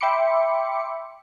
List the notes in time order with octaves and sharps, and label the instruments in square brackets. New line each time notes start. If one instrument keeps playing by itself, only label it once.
[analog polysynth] E5 G5 B5 C6 D6 C#7